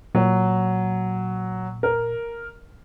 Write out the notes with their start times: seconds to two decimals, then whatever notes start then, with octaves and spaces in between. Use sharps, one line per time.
0.15 A#2 F#3
1.83 A#4